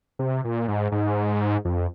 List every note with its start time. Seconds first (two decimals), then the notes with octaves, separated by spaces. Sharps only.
0.19 C3
0.45 A#2
0.68 G#2
0.92 G#2
1.65 F2